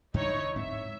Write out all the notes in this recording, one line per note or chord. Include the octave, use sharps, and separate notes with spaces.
E2 D3 D#4 E4 C#5
D1 G#2 C4 E5